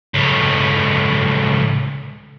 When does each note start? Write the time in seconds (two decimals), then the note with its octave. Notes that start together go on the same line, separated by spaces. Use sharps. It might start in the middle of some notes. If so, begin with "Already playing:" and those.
0.14 C#2 A2